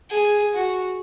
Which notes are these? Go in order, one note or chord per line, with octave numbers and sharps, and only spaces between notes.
G#4
F#4